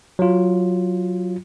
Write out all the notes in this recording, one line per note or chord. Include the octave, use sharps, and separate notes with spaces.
F#3 F4